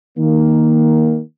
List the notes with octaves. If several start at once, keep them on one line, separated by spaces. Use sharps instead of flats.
D#3 A#3